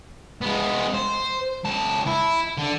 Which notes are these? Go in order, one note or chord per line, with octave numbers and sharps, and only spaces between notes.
G#3 B3
C5
C#2 A5
E4
D3